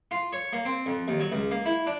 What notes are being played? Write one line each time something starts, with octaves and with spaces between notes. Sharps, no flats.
F4
C#5
A#3
C4
F2
D#2
F#3
C#2
A#3
E4
D4